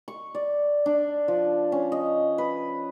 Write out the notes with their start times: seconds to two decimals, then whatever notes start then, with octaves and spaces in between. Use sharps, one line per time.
0.08 C#6
0.35 D5
0.86 D4
1.28 F3
1.72 C#4
1.92 D#5
2.38 B4